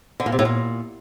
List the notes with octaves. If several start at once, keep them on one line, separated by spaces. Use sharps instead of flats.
D3
A#2
C3
A2
A#2